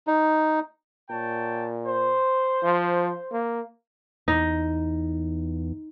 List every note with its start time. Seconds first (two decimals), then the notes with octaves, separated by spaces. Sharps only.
0.07 D#4
1.10 A#2 C#5 G5 A5
1.86 C5
2.63 F3
3.32 A#3
4.28 E2 D#4